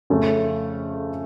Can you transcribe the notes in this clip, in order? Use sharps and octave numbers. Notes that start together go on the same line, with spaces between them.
F2 C#3 A3 C#4